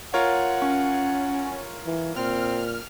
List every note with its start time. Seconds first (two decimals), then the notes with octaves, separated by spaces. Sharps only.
0.14 F4 A#4 C#5 F#5
0.62 C#4
1.86 E3
2.16 A#2 C4 F6